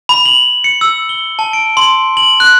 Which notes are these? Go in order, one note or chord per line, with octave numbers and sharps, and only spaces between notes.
B5
F#7
C#7
E6
G7
A5
D7
C6
F#7
F#6